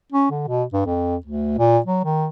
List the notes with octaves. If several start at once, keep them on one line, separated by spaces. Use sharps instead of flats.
C#4
D3
B2
G2
F2
D2
A#2
F#3
D#3